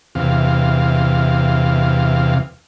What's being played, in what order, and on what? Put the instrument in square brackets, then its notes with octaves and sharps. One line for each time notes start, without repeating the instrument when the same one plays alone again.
[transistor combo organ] E2 C3 F5